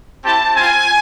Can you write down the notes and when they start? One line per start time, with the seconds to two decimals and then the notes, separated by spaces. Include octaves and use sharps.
0.24 C4 E4 G4 A5
0.56 C4 F4 G#5